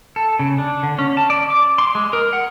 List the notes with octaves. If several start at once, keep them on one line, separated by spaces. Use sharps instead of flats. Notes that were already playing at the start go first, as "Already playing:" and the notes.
A4
C#3
D4
D3
C#4
A5
D5
D6
C6
G#3
A#4
F#5